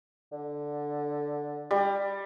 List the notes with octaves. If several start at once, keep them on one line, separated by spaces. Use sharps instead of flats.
D3
G3